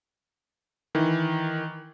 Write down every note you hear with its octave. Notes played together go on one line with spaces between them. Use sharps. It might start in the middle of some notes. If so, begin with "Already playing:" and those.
D#3 E3